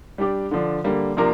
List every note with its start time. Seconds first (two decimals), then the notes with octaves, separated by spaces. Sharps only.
0.18 G3 D4 G4 D5
0.51 D3 F3 D4
0.84 D3 G3 A#3
1.17 C3 F3 A#3 D4 A#4